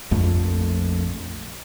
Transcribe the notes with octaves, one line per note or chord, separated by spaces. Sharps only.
A#1 F2 A3